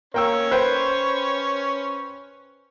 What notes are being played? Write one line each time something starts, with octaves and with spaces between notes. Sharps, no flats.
A#3 C#4 C#5 G5 E6
B4 C5 G5